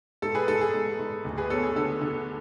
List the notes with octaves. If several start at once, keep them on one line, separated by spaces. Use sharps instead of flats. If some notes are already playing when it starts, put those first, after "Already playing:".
G#2 A4
G#4 B4
G#2 A4
G#4
G#2
G#2
D2
G#4 B4
B3 A4 C#5
G#4
D3 A4
D3